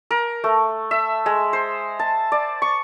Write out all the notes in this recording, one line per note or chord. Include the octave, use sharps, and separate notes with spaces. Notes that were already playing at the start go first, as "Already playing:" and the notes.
A#4
A3
E5
G#3
C5
A5
D5
C#6